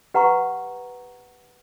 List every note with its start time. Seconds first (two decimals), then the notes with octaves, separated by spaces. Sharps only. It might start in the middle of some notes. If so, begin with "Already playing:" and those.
0.14 G4 B4 F#5 A#5 C#6